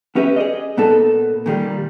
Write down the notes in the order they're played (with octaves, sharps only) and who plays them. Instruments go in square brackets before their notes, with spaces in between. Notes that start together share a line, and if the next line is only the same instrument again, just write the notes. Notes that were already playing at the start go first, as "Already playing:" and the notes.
[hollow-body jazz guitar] B3 C#4 G4 B4 D5 E5
G#4 D5 D#5
A#2 B3 D#4 A4 A5
A#2 D#3 G3 A#3